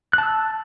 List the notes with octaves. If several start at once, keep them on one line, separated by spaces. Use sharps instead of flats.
A5 E6 F#6